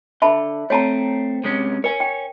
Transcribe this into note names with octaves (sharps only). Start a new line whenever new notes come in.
D3 E5 A5 B5
A3 C4 C#5 A5 A#5
C3 G#3 C#4
A#4 C#5 G#5
G5